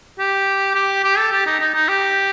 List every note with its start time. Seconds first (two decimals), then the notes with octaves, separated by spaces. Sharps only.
0.19 G4
0.75 G4
1.04 G4
1.18 A4
1.32 G4
1.47 D#4
1.60 D#4
1.75 D#4
1.89 G4